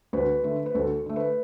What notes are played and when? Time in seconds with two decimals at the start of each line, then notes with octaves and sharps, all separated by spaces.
0.13 D2 B4
0.44 D3 A3
0.66 B4
0.75 D2 A4
1.06 D3 A3
1.16 B4